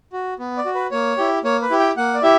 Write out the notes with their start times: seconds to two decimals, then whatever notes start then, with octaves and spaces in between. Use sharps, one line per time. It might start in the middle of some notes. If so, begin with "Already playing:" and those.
0.13 F#4
0.39 B3
0.57 D5
0.66 F#4
0.75 B4
0.91 A#3 C#5
1.18 E4 G4
1.44 A#3 C#5
1.62 B4
1.70 E4 G4
1.80 G5
1.97 A#3 F#5
2.14 D5
2.23 E4 G4 E5